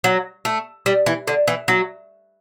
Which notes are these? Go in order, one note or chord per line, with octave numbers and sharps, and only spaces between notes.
F#3
A3
G3
E3
D3
E3
F#3